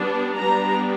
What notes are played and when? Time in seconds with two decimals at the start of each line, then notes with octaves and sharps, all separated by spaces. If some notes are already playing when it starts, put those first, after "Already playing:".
Already playing: G3 B3 D4
0.38 G3 B3 D4 A#5